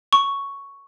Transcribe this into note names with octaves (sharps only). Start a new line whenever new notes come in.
C#6